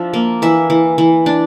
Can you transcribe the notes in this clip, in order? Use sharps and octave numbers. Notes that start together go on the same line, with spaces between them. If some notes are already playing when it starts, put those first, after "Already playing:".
Already playing: F3 D4 E5
A#3
E3 E5
E3
E3
D4